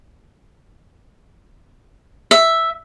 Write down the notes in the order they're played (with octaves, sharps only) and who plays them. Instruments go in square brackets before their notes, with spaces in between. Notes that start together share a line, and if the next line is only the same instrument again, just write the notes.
[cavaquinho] E5